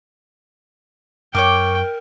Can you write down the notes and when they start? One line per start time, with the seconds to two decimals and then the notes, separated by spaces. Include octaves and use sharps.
1.35 F#2 A#4 C#5 G5 C#6 D6